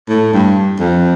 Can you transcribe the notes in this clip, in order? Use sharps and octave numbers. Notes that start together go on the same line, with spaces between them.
A2
G2
F2